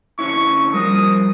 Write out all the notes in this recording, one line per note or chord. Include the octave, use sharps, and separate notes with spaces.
D3 C#4 E4 C#6
F3 G3 F4 A#4 D#6